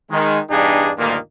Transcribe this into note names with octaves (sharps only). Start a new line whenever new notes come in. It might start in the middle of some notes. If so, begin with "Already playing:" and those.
D#3 G#3
E2 G2 D4 D#4 G4 G#4
D2 G2 A#2 D#3 A#3